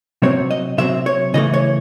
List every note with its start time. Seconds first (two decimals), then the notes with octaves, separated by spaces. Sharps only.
0.22 C3 F#3 C4 C#5
0.51 D#5
0.78 C3 F#3 C4 E5
1.06 C#5
1.34 C#3 E3 A3 D#5
1.54 C#5